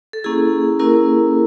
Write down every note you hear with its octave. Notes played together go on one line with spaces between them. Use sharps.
A4
A#3 C#4 E4 G#4
A#3 C#4 E4 A#4